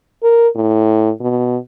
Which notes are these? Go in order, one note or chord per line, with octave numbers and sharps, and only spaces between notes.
A#4
A2
B2